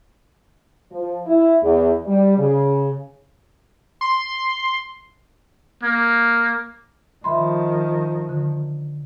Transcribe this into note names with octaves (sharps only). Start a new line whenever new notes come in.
F3
E4
E2
G3
C#3
C6
A#3
D#3 F3 E5 B5 C6
D3